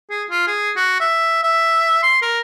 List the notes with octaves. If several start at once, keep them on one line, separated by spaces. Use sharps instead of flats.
G#4
F4
G#4
F#4
E5
E5
C6
A#4